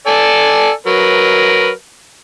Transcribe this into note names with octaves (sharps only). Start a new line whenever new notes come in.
A4 D5 G#5
F#3 A#4 B4